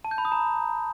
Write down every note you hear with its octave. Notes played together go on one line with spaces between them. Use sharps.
A5
G6
B5
D#6
A#5